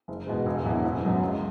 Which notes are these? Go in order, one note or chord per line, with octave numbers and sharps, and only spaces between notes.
F#1
E2 B2 G#3
E1
E2 B2 F#3 E4
F#1
F#2 F#3 B3
C#2